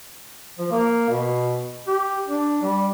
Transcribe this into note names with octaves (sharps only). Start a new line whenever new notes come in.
F3
A#3
B2
G4
D4
G3